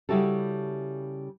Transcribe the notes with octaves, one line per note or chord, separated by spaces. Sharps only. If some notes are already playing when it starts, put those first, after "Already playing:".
C#3 G3 E4 F#4 G4 A4